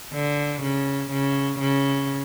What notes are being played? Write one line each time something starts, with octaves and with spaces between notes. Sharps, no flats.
D3
C#3
C#3
C#3